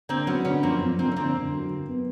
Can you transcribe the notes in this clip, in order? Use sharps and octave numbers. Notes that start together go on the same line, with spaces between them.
D3 A#3 C4
F#3 B3 C#4
D3 B3 C#4
F2 A#3 C4
F2
F2 A#3 C4
C#4
D3 A#3 C4
D3
F#3
D3
B3